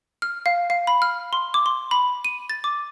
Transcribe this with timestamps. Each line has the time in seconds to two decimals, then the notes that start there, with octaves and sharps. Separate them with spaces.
0.22 F6
0.46 F5
0.70 F5
0.87 B5
1.02 F6
1.33 C6
1.54 D6
1.66 C6
1.91 B5
2.25 D#7
2.50 A6
2.64 D6